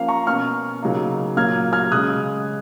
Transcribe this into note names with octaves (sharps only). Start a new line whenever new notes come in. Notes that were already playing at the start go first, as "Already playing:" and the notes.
Already playing: F3 A#3 C#4 F5
A#5 C#6
B2 A#3 C#4 C#6 F6
C#3 F#3 A#3 D#4
A#2 F#3 A#3 F6 G#6
F6 G#6
C#3 G#3 C#4 D#6 F#6